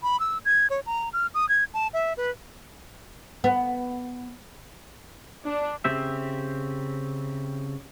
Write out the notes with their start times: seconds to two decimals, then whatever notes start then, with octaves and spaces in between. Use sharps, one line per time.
0.03 B5
0.20 E6
0.45 G#6
0.70 C#5
0.86 A#5
1.13 F6
1.34 D#6
1.49 G#6
1.74 A5
1.93 E5
2.17 B4
3.44 B3
5.46 D4
5.84 C#3 C4 G4 E5